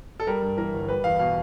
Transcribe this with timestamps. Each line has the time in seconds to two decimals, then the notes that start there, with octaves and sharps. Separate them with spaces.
0.20 A4
0.27 G3 A#4
0.42 G2
0.57 E3 A#4
0.73 G1
0.89 G3 B4
1.04 E2 F5
1.19 B2 F5